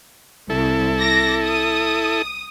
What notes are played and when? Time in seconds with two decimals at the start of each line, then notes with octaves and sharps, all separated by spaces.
0.50 C2 E4 A4
1.00 D6 A#6
1.44 D#6